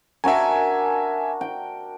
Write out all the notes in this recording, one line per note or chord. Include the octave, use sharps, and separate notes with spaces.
D4 F#4 A#4 E5 G#5
G5